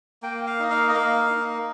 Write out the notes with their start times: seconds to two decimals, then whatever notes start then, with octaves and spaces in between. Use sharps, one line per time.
0.23 A#3 G5
0.47 F5
0.59 D#4 D#5
0.70 F5
0.89 D#5
0.94 A#3 F5
1.30 D#4